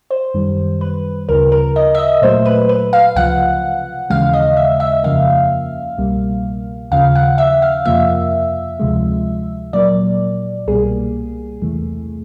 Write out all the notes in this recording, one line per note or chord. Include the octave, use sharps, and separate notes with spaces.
C5
F#2 D#3 G3
B4
D2 C#3 F3 A#4
A#4
D#5
E5
D#5
A#2 F#3 A3 C5
B4
B4
F5
C#2 C3 F3 F#5
D#2 C#3 E3 G#3 F5
D#5
E5
E5
F2 C#3 F3 A#3 F5
C2 B2 G3 A#3
D#2 C#3 F3 F5
F#5
E5
F5
F2 C3 F3 A#3 E5
D2 C3 F3 G#3
A#2 F#3 A#3 D5
C2 B2 G3 A#3 G#4
E2 C3 E3 A3